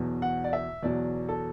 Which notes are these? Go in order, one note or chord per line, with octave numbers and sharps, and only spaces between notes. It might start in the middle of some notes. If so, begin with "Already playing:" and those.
Already playing: E2 B2 F#3
F#5
D5
E5
E2 B2 F#3 D5
A4